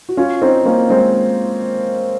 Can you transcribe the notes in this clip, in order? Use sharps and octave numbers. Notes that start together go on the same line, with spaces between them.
F#4
C#4 F4
C4 D#4
A#3 C#4
G#3 C4